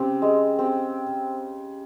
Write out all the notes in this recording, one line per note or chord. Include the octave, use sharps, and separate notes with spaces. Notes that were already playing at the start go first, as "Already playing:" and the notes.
Already playing: C#3 C4 G4
G#3
C4 G4